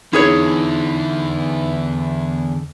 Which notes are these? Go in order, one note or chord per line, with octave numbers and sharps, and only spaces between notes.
E2 D3 E3 D#4 E4 G#4 C#5